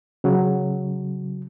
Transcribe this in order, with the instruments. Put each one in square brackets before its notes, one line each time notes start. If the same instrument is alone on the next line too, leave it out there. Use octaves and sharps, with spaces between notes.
[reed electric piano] C#3 F#3